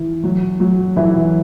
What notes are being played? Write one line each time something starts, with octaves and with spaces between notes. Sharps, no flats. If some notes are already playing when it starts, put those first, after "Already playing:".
Already playing: E3
F#3
F#3
E3 F#3 E4